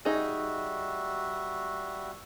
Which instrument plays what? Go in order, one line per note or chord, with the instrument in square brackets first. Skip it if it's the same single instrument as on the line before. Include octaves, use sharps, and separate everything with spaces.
[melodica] G3 F#4 E5 [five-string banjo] D#4 G#4